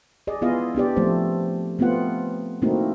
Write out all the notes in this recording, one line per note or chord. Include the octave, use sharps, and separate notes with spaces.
G#4 D5 D#5
B3 E4 F4 G#4 D#5 F5
B3 D4 G4 D5
F3 A3 C4 C5
A3 B3 C4 F4 F#5
A3 A#3 C4 D#4 E4 F#4